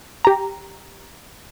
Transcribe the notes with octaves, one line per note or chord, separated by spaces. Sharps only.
G4 A#5